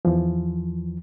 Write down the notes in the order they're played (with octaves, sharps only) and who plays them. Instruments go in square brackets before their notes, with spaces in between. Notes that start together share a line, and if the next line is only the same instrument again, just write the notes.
[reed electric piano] E2 E3 F3